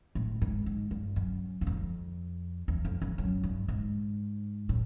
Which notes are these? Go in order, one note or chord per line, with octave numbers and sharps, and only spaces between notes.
A2
G#2
G#2
G2
F#2
F#2
F2
E2
F2
F2
F#2
G2
G#2
A2